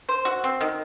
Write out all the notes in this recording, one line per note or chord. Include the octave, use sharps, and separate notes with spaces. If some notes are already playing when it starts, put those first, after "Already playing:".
C5
F#4
C4
D#3